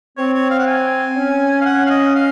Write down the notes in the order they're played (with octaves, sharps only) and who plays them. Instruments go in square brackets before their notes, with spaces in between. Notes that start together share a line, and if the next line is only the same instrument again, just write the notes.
[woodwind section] C4 [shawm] C#5
[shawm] C#5
F5
F#5
G#5
[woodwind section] C#4
[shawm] F5
F#5
F5
D#5
F5